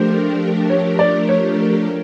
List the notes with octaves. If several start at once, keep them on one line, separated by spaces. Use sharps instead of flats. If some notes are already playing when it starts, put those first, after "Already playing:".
Already playing: F3 A3 D4 G4 A#4 C5
C#5
D5
C#5